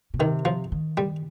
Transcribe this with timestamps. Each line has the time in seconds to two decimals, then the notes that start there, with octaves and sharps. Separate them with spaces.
0.14 B2
0.19 C3 D#3
0.45 F3
0.72 D#3
0.97 G3